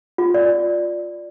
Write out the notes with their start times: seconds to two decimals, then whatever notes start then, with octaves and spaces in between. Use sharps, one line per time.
0.18 F4
0.34 D5